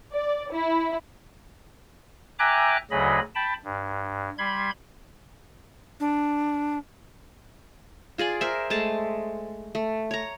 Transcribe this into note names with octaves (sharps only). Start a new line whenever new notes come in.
D5
E4
E5 G5 G#5 A#5 D6 F#6
D2 C#3 F#3 G#4 D#5 B5
G5 A5 B5
G2
G3 B5 C6 G#6
D4
F4 G#4 D5 G#5
A#4 C5 E5
G#3 A3 A5
A3
C#5 A#5